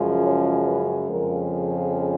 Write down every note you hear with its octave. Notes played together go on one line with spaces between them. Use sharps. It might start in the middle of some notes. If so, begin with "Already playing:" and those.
Already playing: F#2 C#3 F3 G#3
C#5
B4
F2 C#3 F3 G#3 A#4